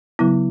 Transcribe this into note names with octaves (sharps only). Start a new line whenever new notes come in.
C#3 F#3 B3 E4